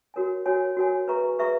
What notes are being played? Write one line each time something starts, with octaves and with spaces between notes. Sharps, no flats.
F#4 A#4 C#5 G#5
F#4 A#4 C#5 G#5
F#4 A#4 C#5 G#5
G#4 B4 E5 A#5 C#6
G#4 B4 E5 A#5 C#6